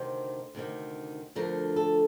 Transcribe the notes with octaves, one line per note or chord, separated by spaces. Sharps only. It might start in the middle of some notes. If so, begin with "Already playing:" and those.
Already playing: D2 C3 D#3 C5
D2 C3 D#3
D2 D3 F3 A3 A#4
A4